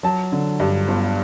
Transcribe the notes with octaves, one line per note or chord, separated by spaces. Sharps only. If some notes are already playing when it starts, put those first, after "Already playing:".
F#3 A5
D3
G2
G1